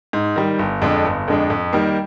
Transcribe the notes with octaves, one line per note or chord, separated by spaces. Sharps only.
G#2
D#3 G3
G1
F2 D3 G#3 D4
G1
F2 D3 G#3 D4
F2
D#3 G3 A#3